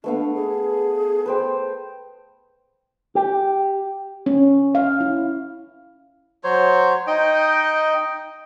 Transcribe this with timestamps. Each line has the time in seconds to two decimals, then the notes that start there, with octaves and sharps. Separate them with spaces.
0.04 A3 B3 D4 F5
0.34 G#4
1.26 B4 C5 G5
3.15 G4
4.26 C#4
4.75 F5
5.00 E4
6.44 F#3 C5 C#5
7.07 D#4 D#5 G5